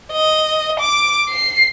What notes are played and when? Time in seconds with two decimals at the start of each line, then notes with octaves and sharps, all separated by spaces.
0.13 D#5
0.80 D6
1.29 C7